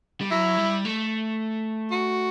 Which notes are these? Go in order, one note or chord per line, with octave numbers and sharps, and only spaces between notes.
G3
F#3 E4
G3
A3
F#4